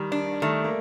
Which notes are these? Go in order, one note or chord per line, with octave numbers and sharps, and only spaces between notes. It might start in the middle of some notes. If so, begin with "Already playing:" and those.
Already playing: D#3 G3
D4
D#3 A3
A#3